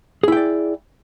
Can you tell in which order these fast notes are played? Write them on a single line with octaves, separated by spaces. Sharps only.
G#4 E4 G5 D5